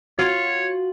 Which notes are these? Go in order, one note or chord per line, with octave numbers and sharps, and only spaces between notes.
F4 F#4 C#5